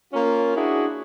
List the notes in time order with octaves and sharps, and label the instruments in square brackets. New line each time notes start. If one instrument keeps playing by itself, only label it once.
[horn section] A#3 C#4 F4
D4 E4 F#4 G#4